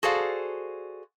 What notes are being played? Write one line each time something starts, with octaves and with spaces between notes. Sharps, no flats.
F#4 G#4 A4 C5 D5 F5